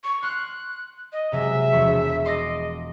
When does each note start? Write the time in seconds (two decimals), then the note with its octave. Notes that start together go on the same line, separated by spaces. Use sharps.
0.04 C#6
0.23 C6 F6 F#6
1.13 D#5
1.32 C3 F#3 G#3 E5
1.72 E1 F3 C#6
2.25 D#5 C6 D6 A#6